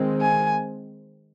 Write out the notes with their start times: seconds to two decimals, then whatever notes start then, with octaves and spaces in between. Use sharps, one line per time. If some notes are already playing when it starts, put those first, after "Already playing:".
Already playing: D#3 G#3 C4
0.21 G#5